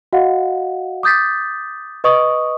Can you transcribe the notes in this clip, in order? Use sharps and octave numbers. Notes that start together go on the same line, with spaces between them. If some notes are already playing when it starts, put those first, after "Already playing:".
F#4 D#5 F5 F#5
D6 D#6 G6 A6 B6
B4 D#5 C#6 D#6